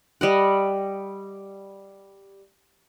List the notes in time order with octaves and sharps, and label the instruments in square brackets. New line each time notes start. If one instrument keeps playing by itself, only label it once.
[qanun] G3 D#5 F#5